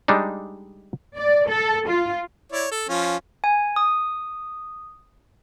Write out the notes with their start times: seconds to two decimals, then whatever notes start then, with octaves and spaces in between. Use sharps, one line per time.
0.08 G3 G#3 D4 D#4
1.17 D5
1.49 A4
1.88 F4
2.52 E4 C#5 D5
2.71 A4
2.89 F3 C#4 F4
3.44 G#5
3.76 D#6